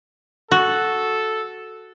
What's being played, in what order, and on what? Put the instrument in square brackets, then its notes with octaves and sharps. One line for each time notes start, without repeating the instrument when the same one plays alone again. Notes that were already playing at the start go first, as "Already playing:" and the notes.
[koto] F#4 [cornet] A4